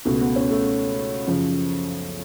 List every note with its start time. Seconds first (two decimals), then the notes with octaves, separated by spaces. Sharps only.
0.05 C#2 B2 A3
0.21 B3
0.36 C#4
0.51 A3
1.27 F#2 C#3 F3